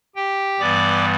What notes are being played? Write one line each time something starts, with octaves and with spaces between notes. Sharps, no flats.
G4 G5
G2 E3 G3 B3 D5 D6